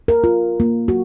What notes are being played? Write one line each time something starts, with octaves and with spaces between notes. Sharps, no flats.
A#4
F4
A#3
F#4